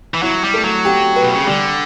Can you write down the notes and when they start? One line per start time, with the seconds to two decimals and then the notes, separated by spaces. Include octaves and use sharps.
0.14 E3
0.23 F#3 E4
0.43 G3
0.54 A3
0.64 F#3
0.85 G4
1.16 B4
1.22 B2
1.35 C#3
1.47 D3 G3